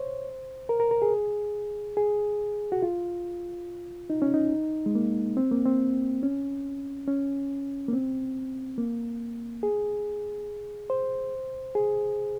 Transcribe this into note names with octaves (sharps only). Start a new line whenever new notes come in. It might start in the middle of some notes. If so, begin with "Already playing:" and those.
Already playing: C5 C#5
A#4
A#4
A#4
G#4
G#4
F#4
F4
D#4
C#4
D#4
G#3
A#3
C4
A#3
C4
C#4
C#4
A#3
C4
A#3
G#4
C5
G#4